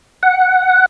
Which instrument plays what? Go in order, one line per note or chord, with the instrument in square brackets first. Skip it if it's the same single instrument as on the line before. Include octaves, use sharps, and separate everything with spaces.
[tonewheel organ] F#5